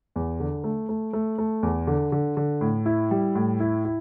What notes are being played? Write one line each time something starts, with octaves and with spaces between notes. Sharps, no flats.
E2
D3
A3
A3
A3
A3
E2
D3
D3
D3
A2
E4
G3
A2
E4
E4